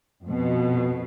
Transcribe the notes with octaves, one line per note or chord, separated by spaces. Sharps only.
F2 B2